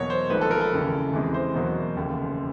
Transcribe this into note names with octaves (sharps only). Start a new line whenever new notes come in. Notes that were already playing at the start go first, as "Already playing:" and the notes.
Already playing: E2 B2 F#3 A#3 C#5
C5
G#1 G#2 F3 A3 B4
A4
A#4
A4
F1 D#2 C#3 E3
E2 C3 E3 G#3
C5
E2 B2 F#3 A#3
F1 D#2 C#3